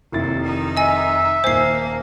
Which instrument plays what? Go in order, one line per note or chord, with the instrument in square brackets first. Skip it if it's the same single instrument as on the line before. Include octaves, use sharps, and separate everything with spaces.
[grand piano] F1 E4 A6 [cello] D#2
[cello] D#3 D#4
[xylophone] D#5 G#5 [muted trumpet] E5
[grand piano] D#1 G#5 [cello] A#3 [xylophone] C5 C7